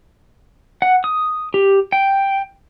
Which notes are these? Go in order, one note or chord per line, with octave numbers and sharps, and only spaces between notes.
F#5
D#6
G4
G5